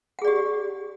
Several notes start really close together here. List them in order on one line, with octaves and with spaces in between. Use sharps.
F#5 G#4 D5 G4